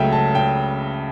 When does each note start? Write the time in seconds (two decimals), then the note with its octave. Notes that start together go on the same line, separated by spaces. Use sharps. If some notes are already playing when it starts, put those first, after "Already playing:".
Already playing: C#2 C#3 F#3 A3 E5 G5
0.12 A5
0.35 G5